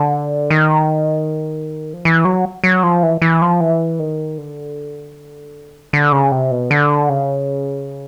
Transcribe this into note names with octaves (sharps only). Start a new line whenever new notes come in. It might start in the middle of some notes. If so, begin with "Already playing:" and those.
Already playing: D3
D#3
F3
E3
F#3
F#3
F3
E3
E3
F3
E3
D#3
D3
D3
C#3
C3
B2
D3
C#3